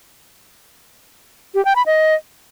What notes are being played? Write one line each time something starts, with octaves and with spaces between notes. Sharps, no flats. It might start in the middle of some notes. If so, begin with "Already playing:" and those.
G4
G5
B5
D#5